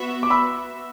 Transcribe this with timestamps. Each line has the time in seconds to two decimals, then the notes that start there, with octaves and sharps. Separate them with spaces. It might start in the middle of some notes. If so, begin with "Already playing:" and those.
Already playing: B3 F#4 B4 E5
0.23 D6
0.30 B5 E6